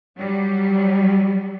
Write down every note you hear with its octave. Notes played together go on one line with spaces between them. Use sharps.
F#3 G3